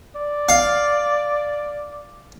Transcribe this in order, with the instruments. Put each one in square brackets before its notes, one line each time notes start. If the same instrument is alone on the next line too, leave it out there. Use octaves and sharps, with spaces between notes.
[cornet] D5
[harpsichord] F5